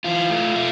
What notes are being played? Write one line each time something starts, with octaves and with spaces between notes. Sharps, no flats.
E3 F4
A3
A3